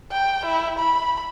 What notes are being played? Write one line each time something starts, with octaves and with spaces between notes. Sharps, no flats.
G5
E4
B5